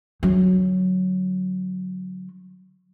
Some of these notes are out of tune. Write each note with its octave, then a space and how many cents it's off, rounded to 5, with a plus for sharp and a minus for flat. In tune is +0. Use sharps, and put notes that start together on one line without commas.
D3 -10 F#3 +0